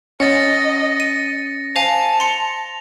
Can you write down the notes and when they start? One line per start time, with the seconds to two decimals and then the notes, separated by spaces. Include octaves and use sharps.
0.20 C#4 D#5 F#5 A6 A#6 C#7
1.00 D#7
1.76 C5 F5 G#5 A5 F7
2.20 C6 C#7